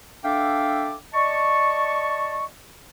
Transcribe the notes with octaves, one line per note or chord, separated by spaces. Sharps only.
D4 A4 E5 F5 G5 D6
D5 D#5 A5 C#6